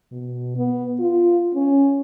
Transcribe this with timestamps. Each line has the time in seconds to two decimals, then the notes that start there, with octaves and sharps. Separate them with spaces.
0.12 B2
0.57 B3
1.00 F4
1.55 C#4